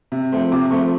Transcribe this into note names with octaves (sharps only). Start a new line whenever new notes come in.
C3
F3 A3 C4
C3 D6
F3 A3 C4 C#6